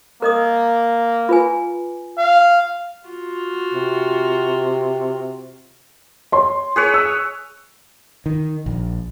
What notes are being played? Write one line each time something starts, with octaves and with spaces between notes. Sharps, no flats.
A#3 A#4 D#5 D#6
F4 B4 G#5
F5
F4 F#4
C3
C#5 C6
G#4 B4 C#5
E6
D#3
A#1